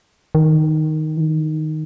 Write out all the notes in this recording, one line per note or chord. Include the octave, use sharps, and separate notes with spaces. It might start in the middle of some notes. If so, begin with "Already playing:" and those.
D#3
E3
D#3